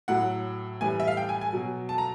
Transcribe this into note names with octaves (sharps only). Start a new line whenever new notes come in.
A2 F#3 F#5
A2 E3 G3 G#5
E5
F5
G5
G#5
G#5
B2 F#3
A5
A#5